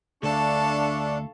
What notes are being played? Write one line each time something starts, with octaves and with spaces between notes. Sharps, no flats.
D2 D4 A4 E5 F5 A5 C#6